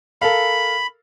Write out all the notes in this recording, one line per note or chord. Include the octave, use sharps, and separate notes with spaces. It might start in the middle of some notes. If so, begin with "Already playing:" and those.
A4 A#4 F5 B5